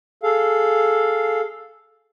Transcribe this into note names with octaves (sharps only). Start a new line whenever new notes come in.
G#4 A4 F5